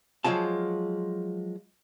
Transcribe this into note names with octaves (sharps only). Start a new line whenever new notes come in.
F3 F#3 G#3 F4 A5